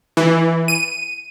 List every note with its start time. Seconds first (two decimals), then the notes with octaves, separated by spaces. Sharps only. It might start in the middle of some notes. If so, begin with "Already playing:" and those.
0.17 E3
0.68 D#7